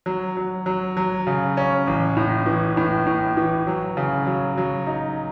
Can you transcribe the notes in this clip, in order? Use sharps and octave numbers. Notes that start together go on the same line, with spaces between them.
F#3
F#3
F#3
F#3
C#3
C#4
A1
A2
E3
A2
A2
E3
F#3
C#3
F#3
F#3
D#4